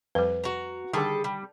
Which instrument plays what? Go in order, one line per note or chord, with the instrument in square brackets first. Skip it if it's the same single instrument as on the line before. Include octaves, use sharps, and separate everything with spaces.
[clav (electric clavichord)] F2 G3 [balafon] B4
[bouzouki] F#4 A#5
[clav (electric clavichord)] D3 D#3 [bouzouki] G3 G#4 A4
[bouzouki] G3